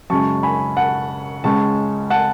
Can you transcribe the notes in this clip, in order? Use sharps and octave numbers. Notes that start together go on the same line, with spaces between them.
F#2 C#3 G#3 A5 C#6
G#5 B5
F#5 A5
C#2 C#3 G#3 A5 C#6
F#5 A5